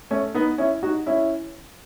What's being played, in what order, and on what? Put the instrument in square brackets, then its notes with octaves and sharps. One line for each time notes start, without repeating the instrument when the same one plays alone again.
[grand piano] A3 C#4
B3 D#4
C#4 E4
D#4 F#4
C#4 E4